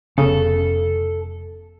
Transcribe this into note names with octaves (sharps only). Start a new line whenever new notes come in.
F1 C#3 B3 C#4 A4